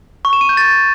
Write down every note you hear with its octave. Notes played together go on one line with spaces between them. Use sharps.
C#6
E7
D#7
G6
A6